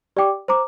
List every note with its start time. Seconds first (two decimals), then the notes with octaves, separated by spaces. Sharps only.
0.16 G4 D5 G5 D6
0.48 C5 A#5 D6